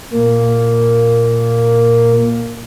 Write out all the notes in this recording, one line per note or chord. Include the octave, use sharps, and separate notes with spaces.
A#2 A#3